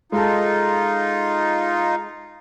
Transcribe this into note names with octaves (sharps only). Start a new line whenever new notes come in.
G#3 D#4 F4 A4 A5